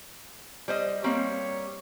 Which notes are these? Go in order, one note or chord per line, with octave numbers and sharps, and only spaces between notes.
G3 C5 D#5
G3 A#3 C4 C#5